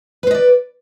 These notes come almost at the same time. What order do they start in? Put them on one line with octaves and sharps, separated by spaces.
B4 C5 D#5 D5